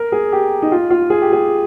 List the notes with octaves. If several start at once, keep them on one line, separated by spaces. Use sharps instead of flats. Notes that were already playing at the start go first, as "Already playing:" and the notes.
Already playing: A#4
G#4
G4
D#4
F4
F4
G#4
G4
G#4